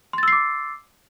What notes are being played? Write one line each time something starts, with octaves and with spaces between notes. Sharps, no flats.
C6 D6 E6 A6 C7